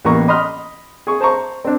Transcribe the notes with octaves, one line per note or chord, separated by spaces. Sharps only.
A1 E3 A#3 B3 A#5 C#6
D#5 B5 C6 D#6 F6
G#4 C#6
C5 A5 A#5 C#6
C4 D4